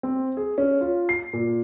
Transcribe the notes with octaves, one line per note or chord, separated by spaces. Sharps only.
C4
G#4
C#4
F4
C7
A#2